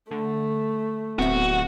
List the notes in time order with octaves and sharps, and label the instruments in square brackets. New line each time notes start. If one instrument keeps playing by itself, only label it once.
[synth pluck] D3 [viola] A3
[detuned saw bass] D1 [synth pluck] B3 C4 E5 [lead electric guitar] F#4